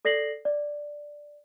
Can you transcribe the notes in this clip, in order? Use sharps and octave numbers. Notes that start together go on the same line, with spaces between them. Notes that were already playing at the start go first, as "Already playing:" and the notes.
A4 D5 A#6 C7 F#7
D5